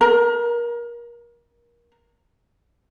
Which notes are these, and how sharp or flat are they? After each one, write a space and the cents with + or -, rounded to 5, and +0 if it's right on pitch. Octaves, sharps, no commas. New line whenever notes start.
A#4 +30